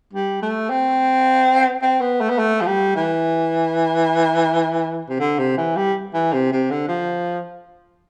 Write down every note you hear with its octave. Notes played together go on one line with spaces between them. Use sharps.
G3
A3
C4
C4
B3
A3
B3
A3
F3
G3
E3
C3
D3
C3
E3
G3
E3
C3
C3
D3
F3